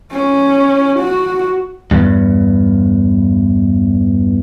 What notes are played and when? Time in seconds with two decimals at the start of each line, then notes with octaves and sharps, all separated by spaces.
0.12 C#4
0.99 F#4
1.91 E2 G2